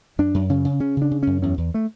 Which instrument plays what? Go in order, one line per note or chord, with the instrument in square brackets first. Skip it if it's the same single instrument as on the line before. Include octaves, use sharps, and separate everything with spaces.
[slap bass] F#2 D4
F#2
C#3 C#4
C#3
C#3 C#4
C#3 D4
C#3
F#2 C#4
E2 C#4
E2
A3